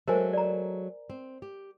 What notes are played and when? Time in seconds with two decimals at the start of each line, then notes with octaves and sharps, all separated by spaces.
0.08 F#3 G#3 A3 A#4 C5 G#5
0.33 D5 A#5
1.10 C4
1.42 G4